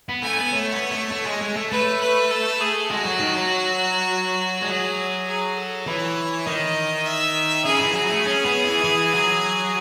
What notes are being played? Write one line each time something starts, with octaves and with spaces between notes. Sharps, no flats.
B3
A3 G#5
C#4
B3
A3 C#5
B3
A3
A3
G#3
G#3
A3
A3 B4
B4
A4
G#4
G#3 F#4
F#3
D#3
F#3
G#3
F#3 G#4
G#4
A4
E3 C#5
D#3 D#5
E5
C#3 G#4
E3
F#3
A3
C#4
B3
E3
E3
F#3